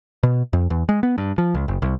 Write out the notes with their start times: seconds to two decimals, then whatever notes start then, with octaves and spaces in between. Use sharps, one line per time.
0.23 B2
0.53 F2
0.70 E2
0.89 G#3
1.03 B3
1.18 G2
1.38 F3
1.54 C#2
1.68 F#1
1.82 C2